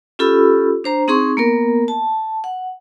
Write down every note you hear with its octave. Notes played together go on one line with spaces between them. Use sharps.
C#4 F4 G4 A4 B5 E6
D4 C5 A#5
C4 D#4 G#4 C6 C#6
A#3 B3 A#4
A5
F#5